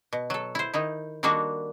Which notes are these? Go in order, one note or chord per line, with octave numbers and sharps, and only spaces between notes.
B2
F#3 A4
E4 C5
D#3 D#4 E4
D#3 G3 A#3 D4 F#4 A4